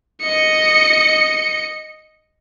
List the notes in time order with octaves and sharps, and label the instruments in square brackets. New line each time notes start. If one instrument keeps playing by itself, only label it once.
[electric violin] D#5 C#7